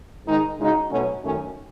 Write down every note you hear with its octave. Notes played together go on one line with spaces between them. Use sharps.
G#2 D#3 G#3 D#4
C#3 G#3 D#4 F#4
B2 F#3 A3 C#4
F#2 D#3 A3 C#4